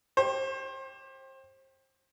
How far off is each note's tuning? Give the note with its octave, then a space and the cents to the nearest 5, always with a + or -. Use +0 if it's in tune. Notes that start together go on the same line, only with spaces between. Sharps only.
G4 +0 C5 +30